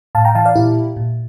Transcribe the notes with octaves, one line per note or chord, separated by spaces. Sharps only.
A2 F5 A5
G5 A#5
E3 F5 A5
D5 F5
A#2 E4 G4
A#2